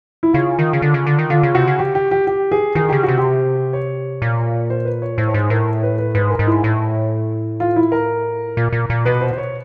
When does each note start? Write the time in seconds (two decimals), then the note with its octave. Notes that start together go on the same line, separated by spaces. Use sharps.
0.23 E4
0.33 C#3 F4
0.59 D#3
0.73 C#3
0.82 D3
0.94 C#3
1.07 D3
1.19 D#3
1.30 D3 F4
1.43 C#3
1.55 C3 F#4
1.67 C#3
1.79 G4
1.95 G4
2.11 G4
2.27 G4
2.52 G#4
2.75 D#3 G#4
2.89 C#3 G4
3.03 F#4
3.08 C3
3.18 G4
3.73 C#5
4.22 A#2
4.70 C5
4.85 B4
5.02 C#5
5.18 A2 C5
5.28 C#5
5.34 G#2 C5
5.50 A2 A#4
5.83 B4
5.98 B4
6.15 G#2 B4
6.30 A#4
6.39 G#2
6.47 E4
6.64 A2
7.60 F4
7.76 E4
7.92 A#4
8.57 A#2
8.72 A#2
8.90 A#2
9.05 B2 B4
9.21 C5
9.33 C5
9.38 C#5